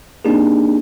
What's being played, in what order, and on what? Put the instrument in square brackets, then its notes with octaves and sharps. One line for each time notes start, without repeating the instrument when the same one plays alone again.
[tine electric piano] A#3 C4 D4 D#4 G4 G#4